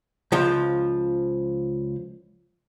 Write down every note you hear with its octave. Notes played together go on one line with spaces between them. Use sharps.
C#2 F3